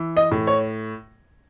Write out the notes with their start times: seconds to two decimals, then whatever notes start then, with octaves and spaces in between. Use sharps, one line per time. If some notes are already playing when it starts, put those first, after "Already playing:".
Already playing: E3
0.17 D#5
0.31 A2
0.47 C#5